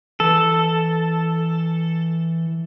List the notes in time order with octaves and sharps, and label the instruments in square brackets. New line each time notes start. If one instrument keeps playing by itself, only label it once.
[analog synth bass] E3 [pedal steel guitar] A4